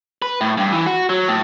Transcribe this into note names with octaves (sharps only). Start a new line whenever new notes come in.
B4
A2
G2
E3
F#4
F#3
A2